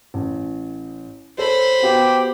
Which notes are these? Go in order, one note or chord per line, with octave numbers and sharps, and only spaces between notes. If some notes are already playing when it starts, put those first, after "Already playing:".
A1
A4 C5 C#5 B5
B3 F#4 G4 F5